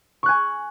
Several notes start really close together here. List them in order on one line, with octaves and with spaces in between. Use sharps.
C#6 F#6 G#5